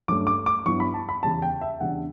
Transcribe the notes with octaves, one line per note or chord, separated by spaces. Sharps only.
G2 F#3 A3 C#4 D6
D6
D6
G2 F#3 B3 E4 C#6
B5
A5
B5
E2 C#3 G3 A5
G5
E5
E2 C#3 G3 D4 F#5